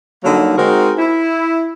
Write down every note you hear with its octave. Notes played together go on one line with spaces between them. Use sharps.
D3 F#3 G3 A#3 D#4
G#3 C4 D#4 F#4 A#4
E4